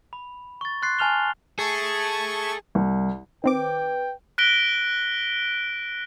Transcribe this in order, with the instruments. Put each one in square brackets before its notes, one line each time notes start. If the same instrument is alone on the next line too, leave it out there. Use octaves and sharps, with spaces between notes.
[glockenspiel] B5
C#6 A6
C6 F#6 A6 C7
G#5 A5 F6 F7 G7
[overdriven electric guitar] G#4 [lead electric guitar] A4 E5 [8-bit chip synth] A5 C#6 G#6
[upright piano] C2
[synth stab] D#3 C4 D6 [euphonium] B4 [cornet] G5
[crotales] F#6 A#6 B6 D7 G7